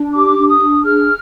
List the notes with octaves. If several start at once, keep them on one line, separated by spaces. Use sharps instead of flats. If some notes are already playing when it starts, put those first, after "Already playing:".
Already playing: D4
G4 D6
D4
D#6
D4
G#4 F6